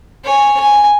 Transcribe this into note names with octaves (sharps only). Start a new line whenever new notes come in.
C#5 G#5
G#5